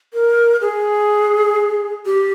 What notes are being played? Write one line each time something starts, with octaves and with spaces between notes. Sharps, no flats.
A#4
G#4
G4